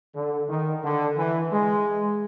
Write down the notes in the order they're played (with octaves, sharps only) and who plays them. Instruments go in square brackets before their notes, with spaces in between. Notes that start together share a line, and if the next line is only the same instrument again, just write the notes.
[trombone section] D3
D#3
D3
E3
G#3